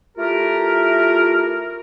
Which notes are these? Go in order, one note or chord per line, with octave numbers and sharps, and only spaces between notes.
A3 E4 F4 G4 A#4